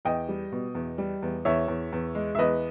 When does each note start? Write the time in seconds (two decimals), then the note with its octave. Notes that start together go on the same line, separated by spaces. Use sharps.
0.05 E2 D#5 G5
0.29 G3
0.52 B2
0.75 E2
0.98 G3
1.22 E2
1.45 E2 C#5 E5
1.68 E2
1.92 E2
2.15 G#3
2.35 E5
2.38 E2 B4 D#5